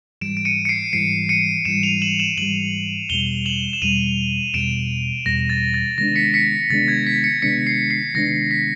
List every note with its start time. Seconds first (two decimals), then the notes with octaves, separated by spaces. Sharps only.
0.21 G#2 E3 G3 D7 E7
0.37 D7
0.45 C#7 D#7
0.65 C#7
0.69 C7 D7
0.93 G#2 E3 G3 C7 D7
1.29 C#7 D#7
1.65 G#2 E3 G3 D7 E7
1.83 D#7 F7
2.02 E7 F#7
2.19 E7 F#7
2.37 G#2 E3 G3 E7 F#7
3.09 E2 B2 G3 F7 G7
3.46 E7 F#7
3.73 E7
3.82 E2 B2 G3 D#7 F7
4.54 E2 B2 G3 D7 E7
5.26 E2 B2 G3 A#6
5.50 A6
5.74 A6
5.98 C3 D#3 G#3 B3 D4 A#6
6.16 B6 C#7
6.34 B6 C#7
6.70 C3 D#3 G#3 B3 D4 A6
6.88 G#6
7.07 B6
7.24 B6 C#7
7.42 C3 D#3 G#3 B3 D4 B6 C#7
7.67 C7
7.91 C7
8.14 C3 D#3 G#3 B3 D4 A#6
8.51 B6